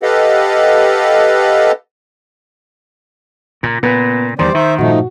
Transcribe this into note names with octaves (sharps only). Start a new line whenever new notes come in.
G4 A4 B4 D#5 F5 F#5
A#2 C#3
A#2 B3
E2 D#3 G3 C5 D5 C6
D#3 C5 E5
G2 A#2 F3 A3 D#4 F#4